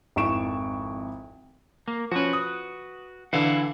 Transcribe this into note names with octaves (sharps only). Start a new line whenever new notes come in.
G#1 F2 E4 C#6 D7 E7
A#3
F3 C#4 F#4 B4
D#6
D3 E3 E4 F5 F#5